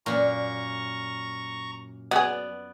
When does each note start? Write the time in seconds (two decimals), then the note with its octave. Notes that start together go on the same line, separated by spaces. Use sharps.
0.06 F#2 A#2 A#5 C#6
2.11 F#3 B3 G#4 D5